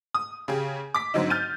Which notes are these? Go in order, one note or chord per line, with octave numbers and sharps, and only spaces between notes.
D#6
C#3 G4 G#4
D6 B6
G#2 D3 F#3 C4 D#4
F6 G6 A6 D#7